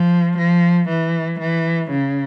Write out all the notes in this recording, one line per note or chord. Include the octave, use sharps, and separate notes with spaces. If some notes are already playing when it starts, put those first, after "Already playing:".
Already playing: F3
F3
E3
E3
C#3